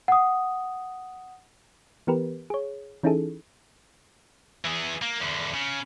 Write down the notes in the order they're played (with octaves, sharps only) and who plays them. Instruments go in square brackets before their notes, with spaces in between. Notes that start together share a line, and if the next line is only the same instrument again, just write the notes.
[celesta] F#5 D#6
[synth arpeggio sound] E3 B3 G4 A#4 B4
G#4 C#5
E3 C#4 D#4 E4 G#4 A4
[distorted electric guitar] E3 G#4
A#3
E2 D3
C#3